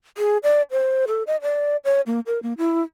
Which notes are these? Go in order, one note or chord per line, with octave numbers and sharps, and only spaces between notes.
G#4
D5
C5
A4
D#5
D5
C#5
A#3
A#4
A#3
E4